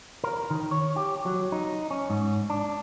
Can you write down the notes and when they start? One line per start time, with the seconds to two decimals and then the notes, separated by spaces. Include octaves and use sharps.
0.24 A#4
0.50 D#3
0.71 C#5
0.96 G4
1.26 F#3
1.52 D#4
1.90 C#4
2.10 G#2
2.50 D4